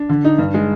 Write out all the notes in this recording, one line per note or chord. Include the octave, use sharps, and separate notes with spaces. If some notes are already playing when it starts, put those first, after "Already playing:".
Already playing: D4
D3
D#4
G2
G#3